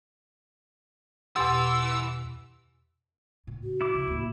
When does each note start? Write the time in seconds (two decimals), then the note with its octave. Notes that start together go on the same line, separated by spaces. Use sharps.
1.36 E2 B2 E3 G4 F#5 C6 E6 A6
3.47 A2 C#3
3.64 F#4
3.81 E4 D6
3.94 C#3 F3
4.07 D#2 A2